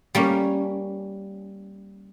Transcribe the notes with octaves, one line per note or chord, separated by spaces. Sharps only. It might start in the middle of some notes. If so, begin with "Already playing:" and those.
G3 A#3 C#4